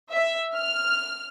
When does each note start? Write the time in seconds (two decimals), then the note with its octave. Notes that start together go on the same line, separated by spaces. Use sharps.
0.12 E5
0.54 F6